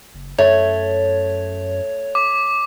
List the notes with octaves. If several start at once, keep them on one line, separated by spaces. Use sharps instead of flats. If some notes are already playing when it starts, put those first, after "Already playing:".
F#1
F#2 A3 C#5
D6